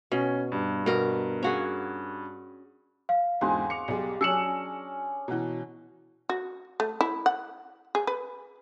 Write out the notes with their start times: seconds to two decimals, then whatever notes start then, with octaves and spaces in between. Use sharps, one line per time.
0.12 B2 C#4
0.52 G2
0.86 B2 A#4
1.43 C#4 F#4 G#4
3.09 F5
3.41 E2 G#2 D3 G#3 C4 F#4
3.70 C#6 D6 C#7 F7
3.88 B1 G3 G#4
4.21 F#3 C#4 D4 G#4 E6 C#7 E7 F#7
5.28 B2 E3 F#5 A#5
6.29 F#4
6.80 A3
7.01 E4
7.26 F#5
7.95 G#4
8.07 B4